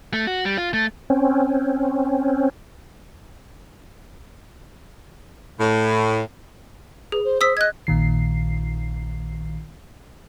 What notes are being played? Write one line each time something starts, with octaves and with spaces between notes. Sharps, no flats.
A3
F#4
G3
F4
A3
C4 C#4
A2
G#4 B4
C5
C5 D#6 E6 B6
D#5 F#6 G#6
A#1 A#2 D#3 C7